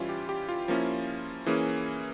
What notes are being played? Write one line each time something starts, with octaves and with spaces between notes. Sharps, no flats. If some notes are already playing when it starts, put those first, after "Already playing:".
Already playing: E3 G3 C#4 E4 F4
G4
G4
F4
F3 A#3 C#4 E4
E3 A#3 C#4 G#4